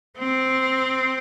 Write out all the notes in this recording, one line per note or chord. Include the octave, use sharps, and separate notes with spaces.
C4